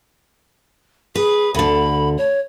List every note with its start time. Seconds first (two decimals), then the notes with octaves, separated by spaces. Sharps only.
1.15 G#4 B4
1.55 D2 D3 B5
2.18 C#5